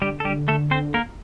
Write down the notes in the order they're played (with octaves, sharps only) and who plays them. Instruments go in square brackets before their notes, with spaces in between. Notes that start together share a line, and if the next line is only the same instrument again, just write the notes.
[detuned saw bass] D3 [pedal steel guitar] G3 G4
[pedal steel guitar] A4
G3 G4
A3 A4
C4 C5
A#3 A#4